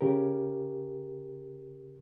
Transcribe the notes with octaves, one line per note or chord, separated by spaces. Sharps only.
C#3 G4 A#4